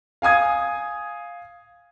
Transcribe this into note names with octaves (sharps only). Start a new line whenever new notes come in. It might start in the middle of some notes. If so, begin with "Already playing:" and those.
F5 G#5 D#6 G#6